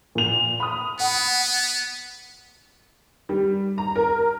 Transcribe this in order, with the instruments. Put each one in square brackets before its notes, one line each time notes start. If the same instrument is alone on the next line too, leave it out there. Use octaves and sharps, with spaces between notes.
[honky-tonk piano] A#2 F7
B5 D#6
[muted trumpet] B3 [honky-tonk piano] F#5
[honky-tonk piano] G3
A#5
A#4